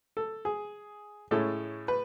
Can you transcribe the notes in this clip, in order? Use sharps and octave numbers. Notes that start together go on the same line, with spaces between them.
A4
G#4
A2 G#3 C#4 E4 A4
B4